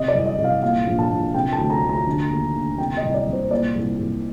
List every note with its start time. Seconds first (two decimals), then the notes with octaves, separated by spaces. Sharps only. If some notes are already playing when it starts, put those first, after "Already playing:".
Already playing: C3 D#5
0.08 D5
0.14 C2
0.26 D#5
0.38 C2
0.44 F5
0.62 A#2 F5
0.86 A#1
0.98 A5
1.10 A#1
1.34 C3 G5
1.52 A5
1.58 D2
1.70 A#5
1.83 D2
1.89 A#5
2.07 D3
2.30 D#2
2.55 D#2
2.78 C3 G5
2.97 D#5
3.03 C2
3.14 D5
3.27 C2
3.33 C5
3.50 A#2 D5
3.75 C2
3.99 C2